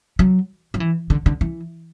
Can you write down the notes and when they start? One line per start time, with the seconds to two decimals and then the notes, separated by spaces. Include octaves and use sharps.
0.19 F#3
0.74 F3
0.80 E3
1.10 D3
1.26 D3
1.41 E3